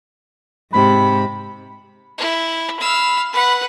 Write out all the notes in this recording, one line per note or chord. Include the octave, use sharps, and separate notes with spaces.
G#2 C3 B5
E4
F5 B5 E6
B4 F#5 B5